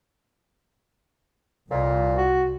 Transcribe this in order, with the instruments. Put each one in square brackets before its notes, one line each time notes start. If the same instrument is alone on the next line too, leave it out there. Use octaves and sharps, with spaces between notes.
[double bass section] C2 [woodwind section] F2 A#2
[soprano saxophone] F#4